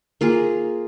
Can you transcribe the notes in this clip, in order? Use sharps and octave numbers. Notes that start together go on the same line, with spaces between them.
A#3 F4 G#4